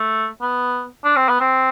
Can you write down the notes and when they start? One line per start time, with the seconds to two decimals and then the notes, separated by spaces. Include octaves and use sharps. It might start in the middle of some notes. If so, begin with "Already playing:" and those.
Already playing: A3
0.41 B3
1.04 D4
1.16 C4
1.29 B3
1.41 C4